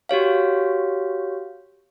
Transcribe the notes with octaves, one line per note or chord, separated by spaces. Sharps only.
F#4 G4 C#5 F5